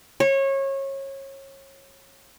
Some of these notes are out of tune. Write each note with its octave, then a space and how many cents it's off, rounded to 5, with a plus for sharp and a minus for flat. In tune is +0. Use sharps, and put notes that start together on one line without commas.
C#5 -25